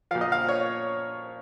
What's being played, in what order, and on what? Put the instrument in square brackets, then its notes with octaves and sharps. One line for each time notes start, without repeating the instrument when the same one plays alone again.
[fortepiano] A#2 F3 F5
D#5
F5
C#5